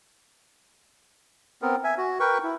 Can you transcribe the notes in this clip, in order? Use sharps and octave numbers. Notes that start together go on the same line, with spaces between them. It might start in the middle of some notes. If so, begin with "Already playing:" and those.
B3 C4 A#4
E5 G#5
F#4
A#4 B4 G5 C#6
E4